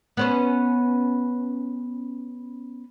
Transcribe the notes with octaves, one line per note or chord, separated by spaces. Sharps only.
B3 C#4 C5